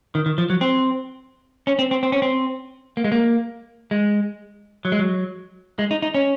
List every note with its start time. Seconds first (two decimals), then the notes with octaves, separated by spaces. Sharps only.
0.15 D#3
0.26 D#3
0.38 F3
0.50 F#3
0.61 C4
1.67 C#4
1.79 C4
1.91 C4
2.03 C4
2.12 C#4
2.22 C4
2.97 A#3
3.04 G#3
3.12 A#3
3.91 G#3
4.85 F#3
4.92 G#3
4.99 F#3
5.79 G#3
5.91 D#4
6.02 D#4
6.14 C#4